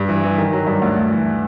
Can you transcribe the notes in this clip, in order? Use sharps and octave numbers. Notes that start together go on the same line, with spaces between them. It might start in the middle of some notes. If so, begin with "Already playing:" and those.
Already playing: G2
E3
E3
D#3
F#3
G2
D2
D2
E3